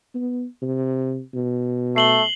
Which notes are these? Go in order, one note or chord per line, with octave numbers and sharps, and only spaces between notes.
B3
C3
B2
A3 C7 F#7 G7